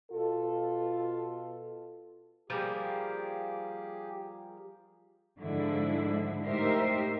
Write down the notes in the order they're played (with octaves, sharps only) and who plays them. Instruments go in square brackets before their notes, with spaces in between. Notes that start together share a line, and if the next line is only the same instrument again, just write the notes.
[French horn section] B2 F4 A4
[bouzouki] F3 G3 A#3 [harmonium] G4 G#4
[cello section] G#2 D3 F3 G#3 E4
A2 D#4 G4 A#4 C5 E5